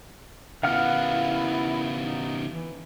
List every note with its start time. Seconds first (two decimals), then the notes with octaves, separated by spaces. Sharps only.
0.63 C#3 B3 E4 F5 F#5 F6
2.02 D#4
2.50 E3